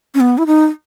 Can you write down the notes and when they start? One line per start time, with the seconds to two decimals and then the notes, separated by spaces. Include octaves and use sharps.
0.15 C#4
0.20 B3
0.38 E4
0.47 D#4